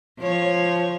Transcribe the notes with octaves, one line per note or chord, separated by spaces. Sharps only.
F3 C#5